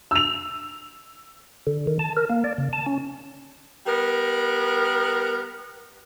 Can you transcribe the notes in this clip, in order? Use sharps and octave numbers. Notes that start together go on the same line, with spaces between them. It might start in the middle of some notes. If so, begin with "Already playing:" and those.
E6 F7
D3
D#3
A5
A#4
A#3
D5
C#3
A5
C#4
G3 B3 A#4